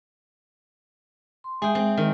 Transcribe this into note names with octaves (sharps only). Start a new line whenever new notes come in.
C6
G#3 G#4 E5 G5
C4
D#3